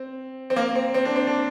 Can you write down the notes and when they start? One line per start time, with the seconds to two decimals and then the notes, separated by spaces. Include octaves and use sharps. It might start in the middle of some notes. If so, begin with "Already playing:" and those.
Already playing: C4
0.50 C4
0.56 A#3
0.75 C4
0.94 C4
1.05 D4
1.16 C4
1.27 D4